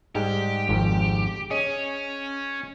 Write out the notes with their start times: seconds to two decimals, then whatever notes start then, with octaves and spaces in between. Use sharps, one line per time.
0.15 G#2 G3 G#3 G4
0.69 G#1 F2 G#2
1.51 C#4 G#4 C#5 D#5